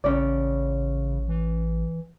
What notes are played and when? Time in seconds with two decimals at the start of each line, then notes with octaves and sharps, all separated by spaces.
0.04 A1 C#3 C#4 D5
1.28 E3